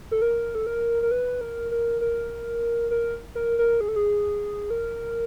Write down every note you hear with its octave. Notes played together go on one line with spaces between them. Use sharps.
A4
A#4
A4
A#4
A#4
B4
A#4
A#4
A#4
A#4
A#4
A#4
G#4
A4
G#4
A#4